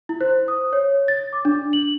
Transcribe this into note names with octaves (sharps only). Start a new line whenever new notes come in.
E4
C5
D#6
C#5
A6
D6
D4
F#7